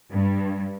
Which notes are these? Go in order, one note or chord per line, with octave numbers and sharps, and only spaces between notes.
G2